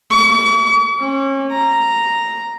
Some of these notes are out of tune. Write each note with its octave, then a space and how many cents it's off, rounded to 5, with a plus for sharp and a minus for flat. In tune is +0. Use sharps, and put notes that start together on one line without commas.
C#6 +45
C#4 -30
A#5 -5